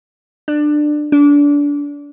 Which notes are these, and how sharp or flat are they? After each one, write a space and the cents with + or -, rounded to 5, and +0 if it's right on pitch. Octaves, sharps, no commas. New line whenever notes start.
D4 +20
D4 -25